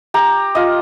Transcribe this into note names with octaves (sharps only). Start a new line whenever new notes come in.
G4 A#5
F4 D#5